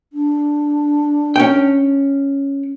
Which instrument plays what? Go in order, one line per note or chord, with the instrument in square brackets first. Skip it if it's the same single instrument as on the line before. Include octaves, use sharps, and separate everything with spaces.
[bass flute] D4
[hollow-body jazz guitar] C#4 G5